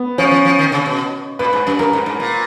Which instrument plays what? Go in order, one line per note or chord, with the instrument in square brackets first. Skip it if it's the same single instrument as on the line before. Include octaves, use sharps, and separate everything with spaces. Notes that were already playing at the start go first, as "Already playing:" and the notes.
Already playing: [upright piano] B3
[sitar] F3 [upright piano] C#4
[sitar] F3
F3
D#3
C#3
B2
[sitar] A#2 [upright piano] B4
[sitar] G#2
F#2
[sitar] F#2 [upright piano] A#4
[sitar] G#2
G#2
A#2